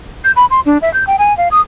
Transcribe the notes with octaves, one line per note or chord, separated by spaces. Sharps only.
G6
B5
C6
D4
E5
G6
G5
G#5
F5
D#6